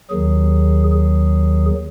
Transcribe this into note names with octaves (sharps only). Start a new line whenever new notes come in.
D#2 D#3 F#3 G#4
G#4